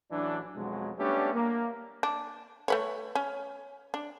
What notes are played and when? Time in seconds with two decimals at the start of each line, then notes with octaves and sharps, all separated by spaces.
0.11 A1 E3 F#3 D4
0.54 F2 B2 F#3 G#3
0.98 G3 A3 B3 C#4 D4 G4
1.34 A#3
2.03 D4
2.68 A3 B4 C#5
3.15 C#4
3.94 D4